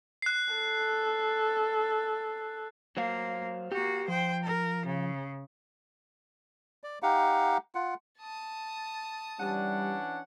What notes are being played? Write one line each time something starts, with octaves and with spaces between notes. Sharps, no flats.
F#6 C7
A4
F#3 A#3 C5 F5
A#3 F#4 G4
F3 C5 G5
A#4
C#3
D5
D#4 G4 F5 F#5
F4 F#5
A5 D#6
E3 G3 C#4 D4 F#5